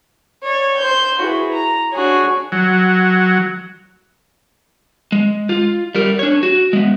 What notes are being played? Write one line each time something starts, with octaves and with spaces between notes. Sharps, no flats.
C#5 D5
C5 G6
E4 F#4 G#4 B4
A#5
D4 F#4 G#4 C#5
F#3
G#3
F4
G3 A#4
D4 C#5
F#4
G#3 B3